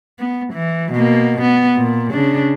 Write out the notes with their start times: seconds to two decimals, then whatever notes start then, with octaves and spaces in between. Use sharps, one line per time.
0.19 B3
0.53 E3
0.92 B2 A#3
1.42 B3
1.76 A#2
2.11 C#3 D4